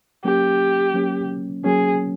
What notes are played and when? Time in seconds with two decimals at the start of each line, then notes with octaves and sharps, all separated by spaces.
0.24 F#3 A#3 C#4 G4
0.94 F#3 A#3 C#4
1.64 F#3 A#3 C#4 G#4